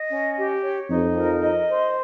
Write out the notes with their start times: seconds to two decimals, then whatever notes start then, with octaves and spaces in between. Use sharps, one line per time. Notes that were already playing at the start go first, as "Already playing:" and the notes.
Already playing: D#5
0.09 C#4
0.36 G4
0.62 C#5
0.89 F2 D#4
1.16 A#4
1.44 D#5
1.70 C5